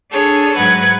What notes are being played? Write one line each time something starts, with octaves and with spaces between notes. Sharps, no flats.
D4 G#4 A4 C#5
G#2 F#3 B4 F#5 G#6